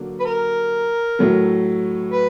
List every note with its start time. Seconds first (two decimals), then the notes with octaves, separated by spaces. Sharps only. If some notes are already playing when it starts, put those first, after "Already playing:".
Already playing: D3 F#3 A#3
0.20 B4
0.25 A#4
1.19 A2 F#3 A3
2.11 B4